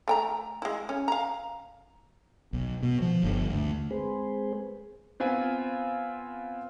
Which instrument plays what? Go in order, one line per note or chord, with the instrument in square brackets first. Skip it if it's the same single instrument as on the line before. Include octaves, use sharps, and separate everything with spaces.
[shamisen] A3 G5 A#5
G#3 E4
C#4
F5 A#5
[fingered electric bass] B1
B2
F3
G1
D2
[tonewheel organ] G#3 C4 G#4 B4 C5
[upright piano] B3 C4 F4 G#5